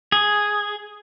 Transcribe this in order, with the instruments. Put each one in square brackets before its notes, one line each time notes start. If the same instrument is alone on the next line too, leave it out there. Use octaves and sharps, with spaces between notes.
[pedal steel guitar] G#4